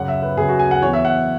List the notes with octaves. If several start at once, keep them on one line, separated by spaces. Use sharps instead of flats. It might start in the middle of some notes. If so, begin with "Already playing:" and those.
Already playing: F#2 C#3 F#3 F#5
E5
B4
F#2 C#3 F#3 G#4
F#4
G#5
F#5
E2 E3 C#5
E5
F#5